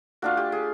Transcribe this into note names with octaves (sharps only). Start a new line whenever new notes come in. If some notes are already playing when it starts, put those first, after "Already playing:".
A3 D4 F4 F#4
G4
G#4